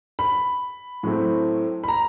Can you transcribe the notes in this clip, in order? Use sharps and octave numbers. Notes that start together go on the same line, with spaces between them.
B5
A2 F#3 A3 C4
B5
A#5